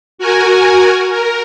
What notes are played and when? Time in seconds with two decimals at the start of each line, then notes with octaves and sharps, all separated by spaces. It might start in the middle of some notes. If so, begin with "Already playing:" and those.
0.18 F#4 A#4 G#5
1.10 A#4